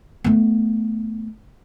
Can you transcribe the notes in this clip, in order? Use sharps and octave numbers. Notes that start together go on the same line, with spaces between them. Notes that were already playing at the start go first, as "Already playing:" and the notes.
A3 B3